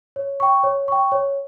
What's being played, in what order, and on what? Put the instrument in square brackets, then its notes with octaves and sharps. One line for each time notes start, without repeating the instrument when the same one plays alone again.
[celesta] C#5
G5 C#6
C#5
G5 C#6
C#5